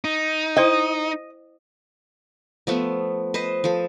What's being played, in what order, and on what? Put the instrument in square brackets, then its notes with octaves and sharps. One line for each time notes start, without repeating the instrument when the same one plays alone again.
[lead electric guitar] D#4
[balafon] E4 C5 G5 [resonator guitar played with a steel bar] D#5
[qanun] F3 A3 B3
B4 C5 D#5
F3 A4